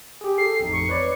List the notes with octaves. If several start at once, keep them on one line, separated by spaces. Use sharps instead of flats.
G4 G#4
A4 C7
A1 F2 D#4
C#6
B4 C#5 D5